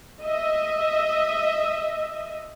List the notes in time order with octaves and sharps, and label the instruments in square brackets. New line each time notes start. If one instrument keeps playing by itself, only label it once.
[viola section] D#5 E5